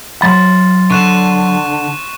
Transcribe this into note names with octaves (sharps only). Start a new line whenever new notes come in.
F#3 B5 C6 A6
D3 C#6 F#6 E7